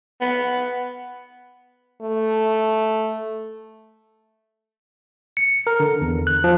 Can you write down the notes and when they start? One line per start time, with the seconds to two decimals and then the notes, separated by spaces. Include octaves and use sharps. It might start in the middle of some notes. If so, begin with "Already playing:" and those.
0.21 B3
2.01 A3
5.37 C#7
5.67 A#4
5.80 D3
6.01 E2
6.27 F#6
6.44 F3